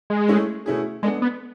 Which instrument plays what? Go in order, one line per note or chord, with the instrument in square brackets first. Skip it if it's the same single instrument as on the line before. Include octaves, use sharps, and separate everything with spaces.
[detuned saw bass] G#3
[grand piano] A3 C#4 E4 G#4
B2 A3 C#4 E4 G#4
[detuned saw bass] G#3 [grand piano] B3 D4 A4 D5
[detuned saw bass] B3